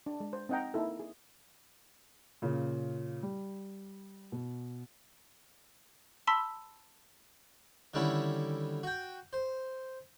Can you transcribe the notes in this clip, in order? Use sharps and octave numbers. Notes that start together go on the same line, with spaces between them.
D4
G#3
C5
C4 D#4 D#5 F#5 G5 A#5
A#3 D#4 E4 A4
G#4
A#2 C#3
G3
B2
A5 B5 C6 E6 B6
D3 D#3 G3 C#4 E4
F#4 G5
C5